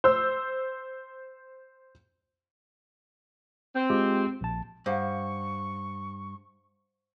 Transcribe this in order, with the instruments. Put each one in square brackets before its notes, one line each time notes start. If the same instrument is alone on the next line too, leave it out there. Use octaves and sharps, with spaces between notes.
[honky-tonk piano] C5 E6
[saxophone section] C4
[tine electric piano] G#3 F4 G4
A#1 A5
[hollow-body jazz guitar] G2 [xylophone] C5 F5 F#5 [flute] C#6